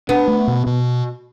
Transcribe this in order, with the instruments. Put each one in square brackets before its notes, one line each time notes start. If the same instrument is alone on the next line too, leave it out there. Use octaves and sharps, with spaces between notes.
[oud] B3 [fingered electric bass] D4
[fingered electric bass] A3
B2
B2